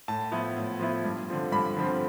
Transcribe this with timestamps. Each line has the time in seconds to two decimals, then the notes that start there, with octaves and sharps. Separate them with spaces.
0.08 A2 A5
0.31 F3 B3 E4
0.56 A2
0.79 F3 B3 E4
1.04 G2
1.28 D3 F3 C4
1.52 G2 B5
1.76 D3 F3 C4